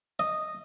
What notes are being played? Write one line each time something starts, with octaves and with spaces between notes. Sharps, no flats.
D#5